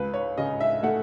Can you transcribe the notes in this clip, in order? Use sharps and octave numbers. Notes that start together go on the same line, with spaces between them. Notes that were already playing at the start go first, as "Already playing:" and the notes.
Already playing: C#2 B4
C#5
C#3 D#5
E5
A3 F#5